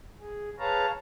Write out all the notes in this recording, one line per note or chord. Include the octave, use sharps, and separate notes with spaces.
G#4
G#4 B4 C#5 F5 A5 A#5